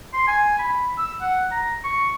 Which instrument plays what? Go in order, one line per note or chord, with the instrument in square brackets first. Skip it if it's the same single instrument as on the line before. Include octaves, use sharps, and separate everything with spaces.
[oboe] C6
G#5
B5
E6
F#5
A#5
C#6